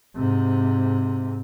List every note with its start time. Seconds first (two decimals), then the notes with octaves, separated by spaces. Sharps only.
0.16 G#2 C3